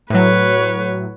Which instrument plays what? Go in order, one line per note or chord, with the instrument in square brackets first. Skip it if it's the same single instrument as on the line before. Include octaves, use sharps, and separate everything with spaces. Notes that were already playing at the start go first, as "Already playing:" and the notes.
[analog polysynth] A2 F#3 [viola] B4 C#5